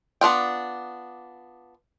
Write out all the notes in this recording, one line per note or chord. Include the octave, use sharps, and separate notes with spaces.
B3 D4 F4 G5